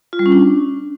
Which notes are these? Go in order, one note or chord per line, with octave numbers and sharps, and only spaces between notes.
F4
G3
C#4
D4